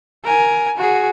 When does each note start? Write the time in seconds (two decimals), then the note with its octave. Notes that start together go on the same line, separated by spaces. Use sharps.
0.24 A#4 G#5
0.77 F#4 G#4